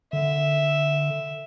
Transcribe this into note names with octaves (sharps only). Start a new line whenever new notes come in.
D3 E5